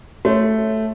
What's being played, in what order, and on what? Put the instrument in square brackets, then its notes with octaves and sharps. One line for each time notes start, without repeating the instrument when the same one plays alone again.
[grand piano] A3 [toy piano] F#4 C#5